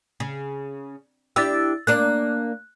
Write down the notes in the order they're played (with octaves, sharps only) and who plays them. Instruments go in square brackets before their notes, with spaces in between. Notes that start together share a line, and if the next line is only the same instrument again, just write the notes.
[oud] C#3
[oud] D4 E4 G4 [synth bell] E6 A6
[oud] A#3 D4 A#4 [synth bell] F#6